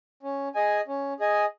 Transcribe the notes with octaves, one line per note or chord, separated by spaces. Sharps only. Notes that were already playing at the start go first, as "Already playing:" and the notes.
C#4
G#4 D#5 G#5
C#4
G#4 D#5 G#5